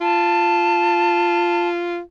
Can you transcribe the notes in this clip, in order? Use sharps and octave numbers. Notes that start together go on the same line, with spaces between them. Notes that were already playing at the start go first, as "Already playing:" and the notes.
F4 A5